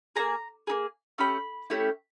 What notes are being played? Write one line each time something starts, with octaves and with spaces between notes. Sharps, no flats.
A#3 D#4 G#4 A#5
A#3 D#4 G#4
A3 C#4 G4 B5
A3 C#4 E4 G4